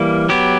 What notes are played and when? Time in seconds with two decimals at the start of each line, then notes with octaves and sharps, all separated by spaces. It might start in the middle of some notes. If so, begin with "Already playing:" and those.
Already playing: E3 G3 A#3
0.29 F#3 B3 G4